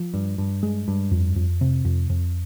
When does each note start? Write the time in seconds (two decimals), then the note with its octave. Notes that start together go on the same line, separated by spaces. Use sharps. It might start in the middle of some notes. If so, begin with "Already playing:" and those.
Already playing: F3
0.14 G2
0.38 G2
0.63 G#3
0.88 G2
1.11 F2
1.36 F2
1.61 C3
1.85 F2
2.10 F2